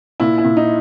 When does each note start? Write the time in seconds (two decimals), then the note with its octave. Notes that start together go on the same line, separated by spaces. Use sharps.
0.20 A#2 E4
0.38 E4
0.45 A#2
0.57 D#4